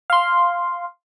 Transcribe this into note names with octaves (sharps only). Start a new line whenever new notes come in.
F5 C6